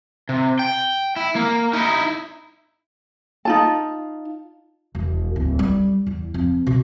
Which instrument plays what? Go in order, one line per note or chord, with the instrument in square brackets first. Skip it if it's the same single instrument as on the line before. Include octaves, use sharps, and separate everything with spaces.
[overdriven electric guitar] C3
G5
E4
A#3
D#4 E4
[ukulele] D#4 F4 A5
[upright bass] E1
D1
G3
E2
F2
B2